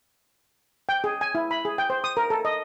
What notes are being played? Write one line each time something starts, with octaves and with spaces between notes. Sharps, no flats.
G5
G#4
G#5
E4
B5
G#4
G5
C5
D#6
A#4
A4
D#5